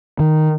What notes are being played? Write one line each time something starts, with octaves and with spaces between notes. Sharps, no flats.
D#3